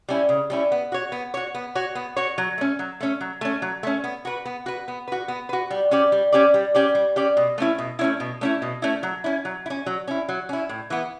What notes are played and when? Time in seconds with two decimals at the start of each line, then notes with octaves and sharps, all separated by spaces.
0.09 G3 C#4 E4
0.29 C#3
0.50 G3 C#4 E4
0.72 B3
0.92 F#4 C#5
1.12 B3
1.34 F#4 C#5
1.55 B3
1.75 F#4 C#5
1.95 B3
2.17 F#4 C#5
2.38 F#3
2.58 A3 C#4
2.79 F#3
3.01 A3 C#4
3.21 F#3
3.41 A3 C#4
3.62 F#3
3.83 A3 C#4
4.04 B3
4.25 F#4 B4
4.45 B3
4.66 F#4 B4
4.88 B3
5.08 F#4 B4
5.28 B3
5.49 F#4 B4
5.71 G3
5.91 C#4 G4 D5
6.12 G3
6.33 C#4 G4 D5
6.54 G3
6.75 C#4 G4 D5
6.95 G3
7.16 C#4 G4 D5
7.37 B2
7.58 A3 C#4 E4
7.78 B2
7.99 A3 C#4 E4
8.20 B2
8.41 A3 C#4 E4
8.62 B2
8.82 A3 C#4 E4
9.03 F#3
9.24 C#4 E4
9.45 F#3
9.66 E4
9.70 C#4
9.86 F#3
10.08 C#4 E4
10.29 F#3
10.49 C#4 E4
10.69 A2
10.90 E3 B3